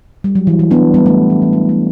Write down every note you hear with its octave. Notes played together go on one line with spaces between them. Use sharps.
G3
F#3
E3
E3
B3 D4
G3 B3
A3
E3
E3
G3
A3